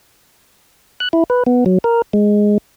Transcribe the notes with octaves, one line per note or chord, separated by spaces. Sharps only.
F#6
E4
B4
B3
F#3
A#4
G#3